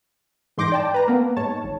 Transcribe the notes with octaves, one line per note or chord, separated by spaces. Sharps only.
E2 G#2 C6 D6 G6 A#6
D5 G5 A5
B4 A#5
A#3 B3
G#2 C#5 A5
G#1